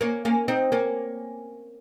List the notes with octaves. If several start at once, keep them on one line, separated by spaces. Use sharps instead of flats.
A#3 C#4
A#3 C#4
C4 D#4
A#3 C#4